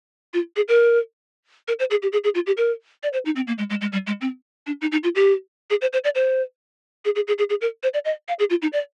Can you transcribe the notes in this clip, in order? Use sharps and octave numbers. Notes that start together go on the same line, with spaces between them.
F4
G#4
A#4
A#4
C5
G#4
G4
G#4
G#4
F4
G4
A#4
D5
C5
D#4
C4
A#3
G#3
G#3
G#3
G3
G#3
C4
D4
D#4
D#4
F4
G4
G#4
C5
C5
D5
C5
G#4
G#4
G#4
G#4
G#4
A#4
C5
D5
D#5
F5
G#4
F4
D#4
D5